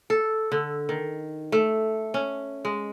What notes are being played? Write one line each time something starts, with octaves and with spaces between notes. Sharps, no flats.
A4
D3
D#3
A3
C#4
G#3